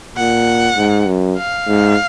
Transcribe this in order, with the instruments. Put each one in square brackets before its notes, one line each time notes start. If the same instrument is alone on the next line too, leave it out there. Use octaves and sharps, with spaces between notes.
[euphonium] A#2 [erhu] F#5
[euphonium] G#2
F#2
[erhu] F5
[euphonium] G#2